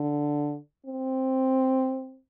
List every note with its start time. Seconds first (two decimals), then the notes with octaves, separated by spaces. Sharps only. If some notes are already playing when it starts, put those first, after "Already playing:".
Already playing: D3
0.86 C4